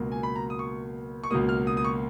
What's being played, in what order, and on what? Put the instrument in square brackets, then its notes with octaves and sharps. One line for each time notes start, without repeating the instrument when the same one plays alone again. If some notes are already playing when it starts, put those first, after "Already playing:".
Already playing: [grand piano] C#2 B2 F#3 A#3
G#5
B5
A#5
D#6
C#6
C#6
C#2 B2 F#3 A#3 D#6
F6
D#6
D#6
C#6